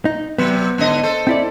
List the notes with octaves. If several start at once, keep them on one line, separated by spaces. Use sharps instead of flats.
D#4
C3 F#3 B3
G#2 D3 D#5
A4 C5
C4 E4 D5